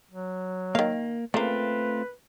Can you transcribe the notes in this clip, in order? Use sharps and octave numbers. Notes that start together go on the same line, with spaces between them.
F#3
D#3 A#3 F5
C#3 A3 A#3 C4 F4 B4